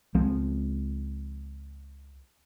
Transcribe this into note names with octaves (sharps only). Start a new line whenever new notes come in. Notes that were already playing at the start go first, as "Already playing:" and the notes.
C#2 F3 G#3 C4